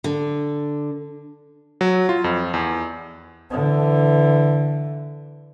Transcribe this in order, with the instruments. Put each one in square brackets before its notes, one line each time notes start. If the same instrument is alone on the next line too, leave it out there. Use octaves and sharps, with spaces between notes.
[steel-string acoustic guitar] D3
[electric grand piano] F#3
F4
F2
E2
[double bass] D3 E3